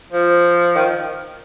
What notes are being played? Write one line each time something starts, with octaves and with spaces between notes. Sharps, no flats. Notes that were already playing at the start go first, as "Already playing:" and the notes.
F3
D#3